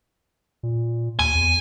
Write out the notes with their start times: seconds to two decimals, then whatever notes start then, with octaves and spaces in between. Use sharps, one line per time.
0.63 A#2
1.19 D#2 G#5
1.35 E2